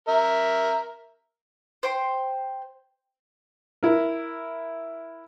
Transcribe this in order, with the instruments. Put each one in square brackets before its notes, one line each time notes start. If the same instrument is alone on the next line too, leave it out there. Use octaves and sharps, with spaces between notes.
[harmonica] A#4 E5
[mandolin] C5 G5 C6
[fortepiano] E4 A#4